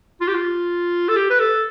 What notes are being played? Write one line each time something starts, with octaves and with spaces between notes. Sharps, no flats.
F4
G4
F4
A4
G4
B4
A4